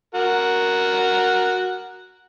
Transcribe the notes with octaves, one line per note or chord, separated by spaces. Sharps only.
F#4 A#4